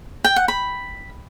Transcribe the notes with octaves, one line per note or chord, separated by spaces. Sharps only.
G5
F#5
B5